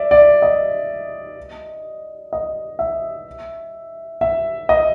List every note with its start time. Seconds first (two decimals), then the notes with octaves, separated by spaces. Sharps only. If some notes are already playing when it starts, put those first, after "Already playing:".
Already playing: D5 E5
0.11 D5
0.42 D#5
2.33 D#5
2.79 E5
4.21 E5
4.69 D#5